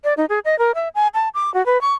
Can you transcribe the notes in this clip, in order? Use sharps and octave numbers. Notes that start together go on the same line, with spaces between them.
D5
D#4
G#4
D#5
A#4
E5
G#5
A5
D6
F#4
B4
C#6